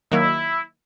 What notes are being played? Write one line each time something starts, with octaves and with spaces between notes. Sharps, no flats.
D#3 F#3 A#3 E4